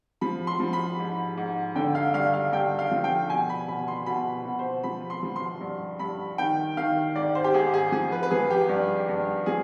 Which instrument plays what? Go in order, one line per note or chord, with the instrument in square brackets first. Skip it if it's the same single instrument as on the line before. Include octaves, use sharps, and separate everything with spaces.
[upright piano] F3 B5
C6
F3
B5
G#2
G#2
D3 G5
F5
G2 F5
F5
G2 G5
F5
F3
G5
B2 G#5
B5
B2 B5
C6
B2 B5
B2
C5
F3 B5
C6
F3
C6
G2
G2 B5
D#3 G5
D#3 F5
G#2 D5
C5
G4
G#2 G#4
G#4
F3 G#4
B4
B4
F3 G#4
G4
G2
G2
F3 G#4